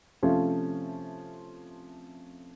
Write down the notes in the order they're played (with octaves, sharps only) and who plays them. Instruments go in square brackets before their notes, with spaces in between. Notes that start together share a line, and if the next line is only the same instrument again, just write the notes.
[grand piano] C3 F3 A3 C#4 F4